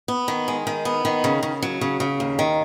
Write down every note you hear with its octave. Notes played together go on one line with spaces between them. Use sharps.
B3
D#3
G#3
D#3
B3
D#3
C#3
C#3
F#3
C#3
C#3
D#2
D#3